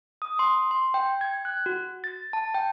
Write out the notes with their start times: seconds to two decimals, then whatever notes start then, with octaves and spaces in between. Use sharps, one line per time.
0.22 D#6
0.39 C6
0.71 C6
0.94 G5
1.21 G#6
1.45 F#6
1.66 F#4
2.04 A6
2.33 A5
2.54 G5